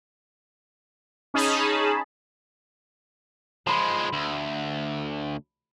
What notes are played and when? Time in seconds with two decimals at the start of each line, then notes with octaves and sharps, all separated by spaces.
1.34 C#4 D#4 G#4 A5 B5
3.67 F3 G#3 B5 C6
4.13 D2